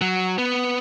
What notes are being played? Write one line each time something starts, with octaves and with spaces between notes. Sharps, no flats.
F#3
B3